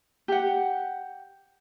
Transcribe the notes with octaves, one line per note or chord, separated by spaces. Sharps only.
G4 F#5